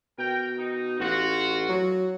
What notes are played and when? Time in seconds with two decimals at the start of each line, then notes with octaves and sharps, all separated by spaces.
0.18 B2 A#4 G5
0.58 D#4
1.00 A1 F4 F#4
1.69 F#3